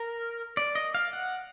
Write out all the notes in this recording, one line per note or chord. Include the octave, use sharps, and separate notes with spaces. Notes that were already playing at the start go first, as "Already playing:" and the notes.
Already playing: A#4
D5
D#5
F5
F#5